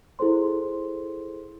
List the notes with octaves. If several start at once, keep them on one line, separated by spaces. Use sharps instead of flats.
E4 G#4 A4 C5 C6